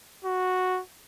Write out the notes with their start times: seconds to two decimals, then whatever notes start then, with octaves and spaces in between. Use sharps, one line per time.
0.25 F#4